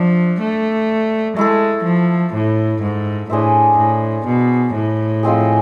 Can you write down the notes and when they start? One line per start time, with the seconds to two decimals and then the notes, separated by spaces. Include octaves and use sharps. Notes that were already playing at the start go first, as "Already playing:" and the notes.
Already playing: F3 D4 E5
0.41 A3
1.36 G#3 A3 E4 A4
1.84 F3
2.34 A2
2.82 G#2
3.30 A2 D4 G#4 C5 E5
3.78 A2
4.26 B2
4.74 A2
5.23 F3 G#3 C4 G#4